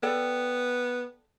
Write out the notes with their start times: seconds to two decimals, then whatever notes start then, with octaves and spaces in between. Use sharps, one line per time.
0.03 B3 A4 D5 G5